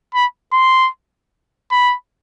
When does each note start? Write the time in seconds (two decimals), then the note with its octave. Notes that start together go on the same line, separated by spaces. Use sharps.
0.14 B5
0.53 C6
1.71 B5